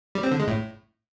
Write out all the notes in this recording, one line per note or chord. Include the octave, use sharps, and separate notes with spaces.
G3
C4
D3
G#3
A2